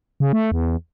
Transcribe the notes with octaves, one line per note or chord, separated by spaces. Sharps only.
C#3
A3
E2